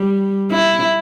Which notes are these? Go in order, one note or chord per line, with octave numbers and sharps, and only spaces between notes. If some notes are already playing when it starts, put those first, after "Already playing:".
Already playing: G3
E4